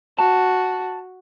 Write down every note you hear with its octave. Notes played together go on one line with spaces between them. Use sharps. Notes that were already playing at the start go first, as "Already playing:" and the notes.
F#4 A5